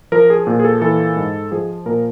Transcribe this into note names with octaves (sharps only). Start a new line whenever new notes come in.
F3 A#4
G#4
A#2
G#4
A4
E3 A4
G#2
F3 G#4
A#2 A#4